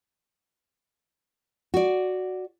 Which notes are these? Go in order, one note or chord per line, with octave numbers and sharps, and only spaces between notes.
F#4 D5